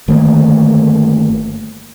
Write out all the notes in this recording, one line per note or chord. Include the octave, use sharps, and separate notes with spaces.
G1 D#3 A3 A#3